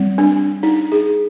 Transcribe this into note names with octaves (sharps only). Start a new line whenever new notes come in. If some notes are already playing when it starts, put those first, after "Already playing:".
Already playing: G3 C4
D4
D#4
G#4